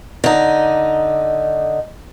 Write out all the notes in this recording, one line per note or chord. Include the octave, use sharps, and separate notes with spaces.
D3 D#4